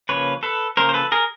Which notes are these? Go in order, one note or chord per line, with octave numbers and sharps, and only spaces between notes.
C#3 F3 A#3 B4 C#5
A4 B4
C#3 F3 A#3 A#4 C5
C5
A4 B4
G#4 A#4